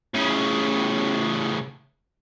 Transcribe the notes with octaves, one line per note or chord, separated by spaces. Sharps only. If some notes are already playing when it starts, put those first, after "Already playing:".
A2 C#3